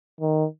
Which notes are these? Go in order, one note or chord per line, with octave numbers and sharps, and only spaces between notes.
D#3